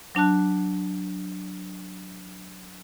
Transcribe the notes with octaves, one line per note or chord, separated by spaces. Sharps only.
F#3 D4 A5 F#6